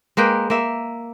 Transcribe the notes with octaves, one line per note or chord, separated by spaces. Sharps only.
G#3 A#3 B4 G5
A#3 E5